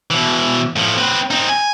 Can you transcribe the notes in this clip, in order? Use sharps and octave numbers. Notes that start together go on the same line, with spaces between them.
B2 E3
A2 F3
C4 B4
C4 D#4
G#5